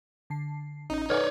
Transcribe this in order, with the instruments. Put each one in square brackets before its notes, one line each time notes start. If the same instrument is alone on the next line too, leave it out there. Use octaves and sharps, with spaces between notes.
[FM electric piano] D3 A5 C7
[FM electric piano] A1 C#4 [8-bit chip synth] D#4
[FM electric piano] A4 F#5 G#5 [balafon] B4 [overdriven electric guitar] C#5 D5